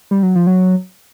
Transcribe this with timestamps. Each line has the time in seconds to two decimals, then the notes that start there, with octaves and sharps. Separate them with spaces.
0.11 G3
0.23 F#3
0.35 F3
0.47 F#3